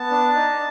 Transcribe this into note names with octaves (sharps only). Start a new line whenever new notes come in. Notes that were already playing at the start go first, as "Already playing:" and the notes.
Already playing: B3 A5
D4
D#4